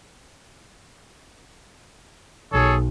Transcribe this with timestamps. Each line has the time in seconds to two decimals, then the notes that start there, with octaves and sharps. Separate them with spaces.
2.53 B1 G#4 A4 C#5